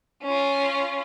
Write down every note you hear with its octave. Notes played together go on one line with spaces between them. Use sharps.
C#4 F4